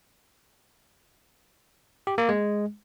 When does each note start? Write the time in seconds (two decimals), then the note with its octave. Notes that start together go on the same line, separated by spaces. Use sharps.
2.07 G4
2.18 A#3
2.29 G#3